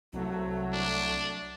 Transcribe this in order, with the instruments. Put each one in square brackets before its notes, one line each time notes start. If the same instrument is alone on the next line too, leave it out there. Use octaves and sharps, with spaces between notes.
[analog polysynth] C2 A3 [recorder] F#3
[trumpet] D4